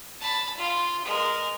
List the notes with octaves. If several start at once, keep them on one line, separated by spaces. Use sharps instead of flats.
A5 B5
F4 F5
G#3 A#4